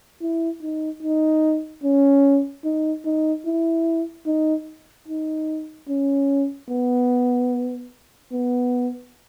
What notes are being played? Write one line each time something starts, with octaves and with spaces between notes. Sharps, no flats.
E4
D#4
D#4
C#4
D#4
D#4
E4
D#4
D#4
C#4
B3
B3